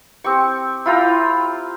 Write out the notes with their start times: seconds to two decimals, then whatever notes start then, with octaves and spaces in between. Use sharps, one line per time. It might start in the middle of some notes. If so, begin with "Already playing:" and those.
0.24 C4 G4 C#6
0.86 E4 F4 G5 A#5